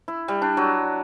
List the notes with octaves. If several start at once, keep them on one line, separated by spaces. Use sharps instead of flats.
E4
G3
D4
F#3